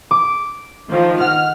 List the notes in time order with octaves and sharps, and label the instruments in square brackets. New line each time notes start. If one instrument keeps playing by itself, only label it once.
[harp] D6
[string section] D#3 F3
[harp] F#5 [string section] F6